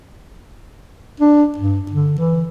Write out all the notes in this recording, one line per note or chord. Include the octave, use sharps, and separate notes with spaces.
D4
G2
D3
E3